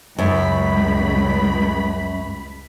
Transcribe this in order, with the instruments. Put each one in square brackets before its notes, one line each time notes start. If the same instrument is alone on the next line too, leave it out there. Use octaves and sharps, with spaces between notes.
[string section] C#2 B5 [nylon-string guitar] F#2